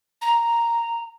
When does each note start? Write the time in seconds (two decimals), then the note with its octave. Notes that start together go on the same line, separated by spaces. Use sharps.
0.22 A#5